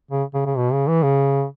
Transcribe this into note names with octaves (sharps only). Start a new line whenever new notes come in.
C#3
C#3
C#3
B2
C#3
E3
C#3